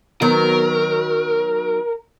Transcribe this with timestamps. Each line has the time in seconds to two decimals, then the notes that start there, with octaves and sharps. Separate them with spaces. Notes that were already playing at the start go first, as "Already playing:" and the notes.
0.22 D#3 F#3 B3 A#4